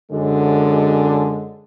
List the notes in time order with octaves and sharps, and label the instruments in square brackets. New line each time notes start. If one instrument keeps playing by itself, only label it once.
[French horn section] F#2 D3 G#3